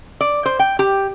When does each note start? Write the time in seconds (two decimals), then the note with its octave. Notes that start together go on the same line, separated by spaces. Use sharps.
0.21 D5
0.46 C5
0.59 G5
0.79 G4